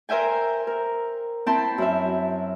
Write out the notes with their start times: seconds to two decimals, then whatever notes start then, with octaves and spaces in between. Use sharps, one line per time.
0.09 A#4 C5 E5 G5 G#5
0.67 A#4
1.46 C4 E4 G5 A5 B5 C6
1.78 F#2 E4 E5